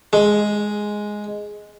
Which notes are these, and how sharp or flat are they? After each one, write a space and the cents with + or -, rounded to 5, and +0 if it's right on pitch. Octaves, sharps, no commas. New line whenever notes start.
G#3 +5